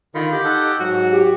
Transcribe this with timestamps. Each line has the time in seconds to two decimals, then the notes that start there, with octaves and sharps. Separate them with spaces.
0.15 D3 D#3 F4 B5
0.32 G4
0.44 D#4 A4 F#5
0.80 G#2 F#3 F#4
1.13 G4